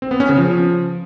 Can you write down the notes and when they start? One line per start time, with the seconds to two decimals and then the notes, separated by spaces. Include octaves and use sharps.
0.02 C4
0.11 B3
0.20 C#4
0.29 C#3
0.38 F3